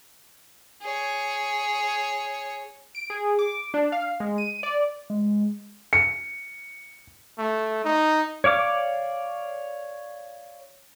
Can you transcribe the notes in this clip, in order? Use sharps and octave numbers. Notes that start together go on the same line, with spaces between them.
G#4 C#5
D7
G#4
D6
D4
F5
G#3
D#7
D5
G#3
C#7
A3
D#4
C#5 D5 F5 D6